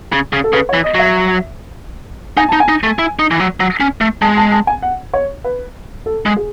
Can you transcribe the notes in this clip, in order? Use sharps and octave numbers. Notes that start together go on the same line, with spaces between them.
C#3
C#3
A4
C#3 B4
C#5
E3
D#5
F#3 E5
D#4 G#5
D#4 A5
G#5
D#4
A3
E4
D#4
E3
F#3
F#3
C#4
A3
G#3 A5
A5
A5
G#5
F#5
C#5
B4
A4
G#3
G#4